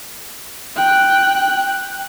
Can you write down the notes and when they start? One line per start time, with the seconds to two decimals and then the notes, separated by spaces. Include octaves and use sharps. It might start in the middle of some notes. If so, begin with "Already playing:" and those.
0.76 G5 F#6